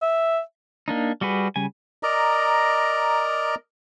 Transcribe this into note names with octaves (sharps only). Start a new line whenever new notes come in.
E5
A#3 D4 D#4
G3 F#4 G#4 B4
C#3 G3 G#5
A#4 D5 D#5 A#5